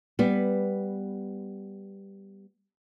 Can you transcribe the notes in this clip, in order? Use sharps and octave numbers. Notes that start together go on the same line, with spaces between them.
G3 B3